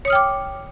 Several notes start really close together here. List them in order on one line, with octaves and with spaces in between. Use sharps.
C#5 D#6 F6 G5 D6